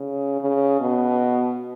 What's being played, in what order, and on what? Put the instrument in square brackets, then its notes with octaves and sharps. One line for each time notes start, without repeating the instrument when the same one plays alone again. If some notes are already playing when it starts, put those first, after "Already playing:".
Already playing: [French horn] C#3
C#3
B2